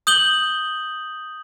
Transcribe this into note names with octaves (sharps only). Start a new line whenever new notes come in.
D#6 G6 F#7 G7